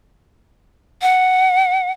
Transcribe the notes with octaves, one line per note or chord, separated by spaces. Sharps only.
F#5